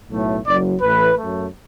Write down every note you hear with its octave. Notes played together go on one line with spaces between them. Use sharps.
B1 A2 F#3 A3
F#1 F#2 F#3 D5
A1 A2 E3 A3 B4
F#2 F#3 A3